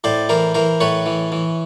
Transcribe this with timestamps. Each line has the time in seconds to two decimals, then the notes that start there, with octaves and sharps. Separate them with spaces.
0.04 A2 C5 D5
0.29 E3 A#4 C5
0.54 E3 A#4 C5
0.80 A2 B4 C#5
1.06 E3
1.32 E3